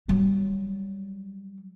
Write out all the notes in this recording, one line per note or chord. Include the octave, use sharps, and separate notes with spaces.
F#3 G3